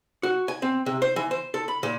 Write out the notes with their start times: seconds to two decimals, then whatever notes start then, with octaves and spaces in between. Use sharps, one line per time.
0.23 F#4
0.48 G#5
0.62 C4
0.86 C3
1.02 C5
1.16 E3
1.31 C5
1.54 A4
1.68 B5
1.83 A#2